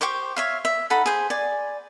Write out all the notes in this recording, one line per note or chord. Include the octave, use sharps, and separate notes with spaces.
G4 C5 C#6 D6
C#5 E5 F5
E5
D#4 A4 F#5 B5
G#4 C5
D5 G#5